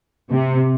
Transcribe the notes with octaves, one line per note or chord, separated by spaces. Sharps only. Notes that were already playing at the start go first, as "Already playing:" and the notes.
C3